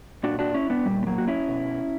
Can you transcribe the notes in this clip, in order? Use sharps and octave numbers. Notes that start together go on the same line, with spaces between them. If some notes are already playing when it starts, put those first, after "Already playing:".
A#2 D4 F#4
D4 F#4
C#4 E4
B3 D4
A#2 G3
B3
F#3 A#3
F#4
C#4 E4
B2